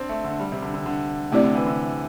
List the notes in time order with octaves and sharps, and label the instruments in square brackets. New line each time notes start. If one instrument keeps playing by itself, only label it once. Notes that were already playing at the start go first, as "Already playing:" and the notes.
Already playing: [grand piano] C4 D4
A3
D3
G3
C3
D3
D3
D3
[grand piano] C3 [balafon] A3 C4 E4 G4 D5
[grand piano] D3
E3
D3